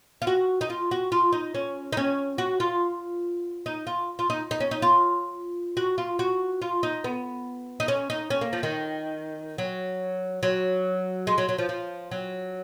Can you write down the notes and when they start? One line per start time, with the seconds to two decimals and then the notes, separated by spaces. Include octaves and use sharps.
0.22 F4
0.27 F#4
0.61 D#4
0.70 F4
0.91 F#4
1.12 F4
1.33 D#4
1.54 C#4
1.92 D#4
1.97 C#4
2.38 F#4
2.60 F4
3.66 D#4
3.87 F4
4.19 F4
4.30 D#4
4.51 D#4
4.60 C#4
4.71 D#4
4.82 F4
5.77 F#4
5.98 F4
6.19 F#4
6.62 F4
6.83 D#4
7.04 B3
7.80 D#4
7.88 C#4
8.10 D#4
8.30 C#4
8.41 A#3
8.53 F3
8.63 D#3
9.58 F#3
10.43 F#3
11.27 G#3
11.38 F#3
11.49 F#3
11.58 F3
11.69 F3
12.11 F#3